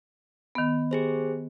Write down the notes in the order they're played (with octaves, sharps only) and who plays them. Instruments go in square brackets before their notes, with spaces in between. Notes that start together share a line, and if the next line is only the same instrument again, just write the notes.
[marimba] D#3 B3
[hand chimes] G4 G#4 C5